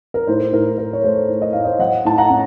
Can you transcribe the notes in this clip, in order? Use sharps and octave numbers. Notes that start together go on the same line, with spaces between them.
A#4
A2 C5
A2 A#4
A2 A#4
C#5
A3 C5
A2
D#5
A2 F5
C5 D#5
F#3 D#5 F#5
A2 A5
F#5 A#5
C#4